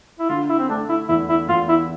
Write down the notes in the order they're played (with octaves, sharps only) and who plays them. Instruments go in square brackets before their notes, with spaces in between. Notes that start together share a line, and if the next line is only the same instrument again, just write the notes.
[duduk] E4
[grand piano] D3 [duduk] F4
[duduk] E4
C4
[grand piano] A3 [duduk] D4
[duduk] E4
[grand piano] E2 [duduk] E4
[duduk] E4
[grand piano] E2 [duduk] F4
[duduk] E4